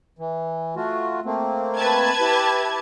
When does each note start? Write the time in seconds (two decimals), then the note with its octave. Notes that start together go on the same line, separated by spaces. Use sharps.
0.19 E3
0.76 A3 F4 F#4
1.25 A3 A#3 C4
1.77 B4 A5 G#6
2.20 E4 G4